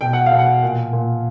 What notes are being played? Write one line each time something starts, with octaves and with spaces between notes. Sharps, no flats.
B2 G5
F#5
F5
B2
F#5
A#2
A#2